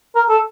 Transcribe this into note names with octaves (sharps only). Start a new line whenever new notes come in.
A#4
A4